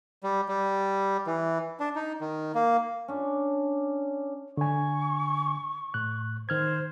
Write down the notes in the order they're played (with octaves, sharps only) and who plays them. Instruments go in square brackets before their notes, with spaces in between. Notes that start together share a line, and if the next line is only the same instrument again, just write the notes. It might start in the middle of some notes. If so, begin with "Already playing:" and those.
[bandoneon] G3
G3
E3
D4
D#4
D#3
A#3
[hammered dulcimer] C#4 D4
[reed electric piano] D3 G#5 [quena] C#6
[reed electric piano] A2 F#6
[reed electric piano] D#3 F6 G#6 [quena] C5